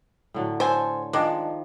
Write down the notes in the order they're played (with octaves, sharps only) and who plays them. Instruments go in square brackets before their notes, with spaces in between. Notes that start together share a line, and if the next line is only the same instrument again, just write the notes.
[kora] A2 D3 F#3
[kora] A4 [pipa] C5 G#5
[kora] D#3 F3 [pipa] G#3 D4